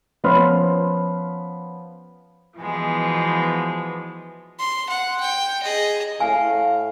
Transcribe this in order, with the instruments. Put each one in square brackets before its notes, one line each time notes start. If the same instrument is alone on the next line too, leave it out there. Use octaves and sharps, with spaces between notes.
[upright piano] F3 B3 C#4 B5 C6 F6
[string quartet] B2 E3 F3 G#3 B3
[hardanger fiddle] C6
F#5
G5
G#4 D#5
[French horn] A2 [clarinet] F5 [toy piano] G#5